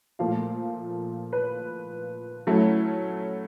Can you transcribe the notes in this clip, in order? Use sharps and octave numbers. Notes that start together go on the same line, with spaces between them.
A#2 F3 A3 F5
B4
F#3 A3 C#4 E4